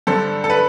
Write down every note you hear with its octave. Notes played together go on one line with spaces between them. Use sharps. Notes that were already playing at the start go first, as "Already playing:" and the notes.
G2 D3 A4 C5
A4
B4